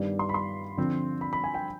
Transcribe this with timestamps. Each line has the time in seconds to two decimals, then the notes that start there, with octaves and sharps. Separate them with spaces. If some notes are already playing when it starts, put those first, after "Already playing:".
Already playing: G2 D#3 G3 B3 D5
0.19 C6
0.29 B5
0.34 C6
0.77 D3 F3 C4
1.21 B5
1.33 B5
1.44 G#5
1.54 G5